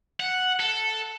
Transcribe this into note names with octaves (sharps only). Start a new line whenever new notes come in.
F#5
A4